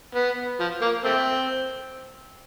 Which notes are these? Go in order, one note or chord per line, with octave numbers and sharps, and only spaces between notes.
B3
F3
A#3
A3 C4